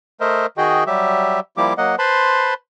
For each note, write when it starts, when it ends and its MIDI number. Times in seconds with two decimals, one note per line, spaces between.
0.21 0.46 57
0.21 0.46 70
0.21 0.46 72
0.21 0.46 75
0.21 0.46 76
0.58 0.84 51
0.58 0.84 66
0.58 0.84 68
0.58 0.84 75
0.58 0.84 79
0.87 1.40 54
0.87 1.40 55
0.87 1.40 67
0.87 1.40 76
1.57 1.73 53
1.57 1.73 55
1.57 1.73 58
1.57 1.73 64
1.57 1.73 67
1.57 1.73 86
1.78 1.96 54
1.78 1.96 58
1.78 1.96 75
1.78 1.96 78
1.99 2.54 71
1.99 2.54 72
1.99 2.54 81
1.99 2.54 83
1.99 2.54 84